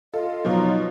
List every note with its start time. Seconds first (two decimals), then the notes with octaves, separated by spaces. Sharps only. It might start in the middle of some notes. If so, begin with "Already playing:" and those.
0.14 F4 A4 D#5
0.45 B2 F3 F#3 D#4